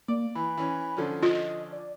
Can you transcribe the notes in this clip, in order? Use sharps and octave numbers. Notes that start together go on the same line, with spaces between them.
A#3 D5
E3 B5
E3 C#4
D3 F3 C#4
F4 D#5
D5